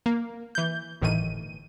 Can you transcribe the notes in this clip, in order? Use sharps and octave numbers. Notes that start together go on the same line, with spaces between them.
A#3
E3 G6
G1 A2 D#3 E3 D#7